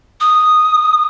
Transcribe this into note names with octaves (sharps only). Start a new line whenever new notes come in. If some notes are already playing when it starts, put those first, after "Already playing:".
D#6